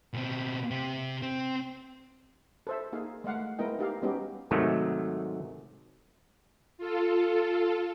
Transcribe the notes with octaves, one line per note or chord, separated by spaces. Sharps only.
B2 C4
C3 G4
C4
A4 C5 E5
A#3 D#4 G#4 F5
G#3 A3 F5 F#5
G#3 B3 E4 A#4 D#5 G5
D#4 G4 F5
G3 G#3 B3 C#4 D#4 G4
G#2 C3 D#3 F#3 A3
F4 A4